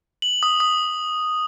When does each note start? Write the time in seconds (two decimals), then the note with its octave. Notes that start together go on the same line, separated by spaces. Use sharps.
0.22 F#7
0.43 D#6
0.60 D#6